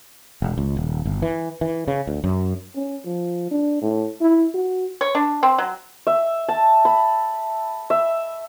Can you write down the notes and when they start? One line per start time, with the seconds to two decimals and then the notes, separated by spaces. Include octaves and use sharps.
0.42 E1
0.58 C#2
0.77 D#1
1.05 G1
1.22 E3
1.61 E3
1.88 C#3
2.07 D2
2.24 F#2
2.75 C#4
3.05 F3
3.51 D4
3.82 A2
4.21 E4
4.54 F#4
5.01 C#5
5.15 D4
5.43 C4
5.58 F#3
6.07 E5
6.49 A5
6.85 B5
7.90 E5